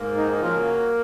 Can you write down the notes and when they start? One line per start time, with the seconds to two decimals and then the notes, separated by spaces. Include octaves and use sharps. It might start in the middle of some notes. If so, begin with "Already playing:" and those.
Already playing: G#2 A#3
0.17 D#3 D#4
0.31 D#4
0.41 C#3 F3 F#3 A#3 F4